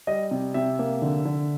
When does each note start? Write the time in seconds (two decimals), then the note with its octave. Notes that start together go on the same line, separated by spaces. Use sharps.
0.07 G3 D#5
0.31 C3
0.54 C3 E5
0.79 A#3
1.02 D3
1.25 D3